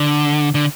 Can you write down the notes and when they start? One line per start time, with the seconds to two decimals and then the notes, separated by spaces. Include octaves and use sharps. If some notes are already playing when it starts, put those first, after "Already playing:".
Already playing: D3
0.55 D3